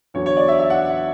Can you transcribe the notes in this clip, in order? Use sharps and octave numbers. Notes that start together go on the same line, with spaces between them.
E2 D3 F#3 C#5
C#5
D5
E5
E5
F#5